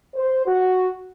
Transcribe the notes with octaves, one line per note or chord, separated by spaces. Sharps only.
C5
F#4